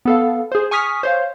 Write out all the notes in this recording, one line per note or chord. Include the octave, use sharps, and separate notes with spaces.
B3 A4 F5
G#4 C5
G#5 C#6 D#6 F6 B6
C5 C#5 F5